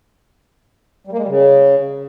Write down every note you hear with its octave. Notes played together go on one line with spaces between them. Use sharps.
G3
A#3
G#3
G3
C#3